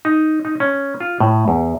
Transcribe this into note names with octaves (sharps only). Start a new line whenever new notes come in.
D#4
D#4
C#4
F4
A2
E2